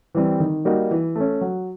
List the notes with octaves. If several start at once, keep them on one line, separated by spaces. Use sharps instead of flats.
E3 G3 C4
D#3
G3 A#3 D#4 F#4
E3
A3 C#4
F#3